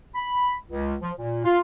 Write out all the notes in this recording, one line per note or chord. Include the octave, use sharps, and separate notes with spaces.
B5
C#2
F3
A#2
F4